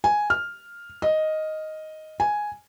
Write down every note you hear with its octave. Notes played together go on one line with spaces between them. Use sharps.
G#5
F6
D#5
G#5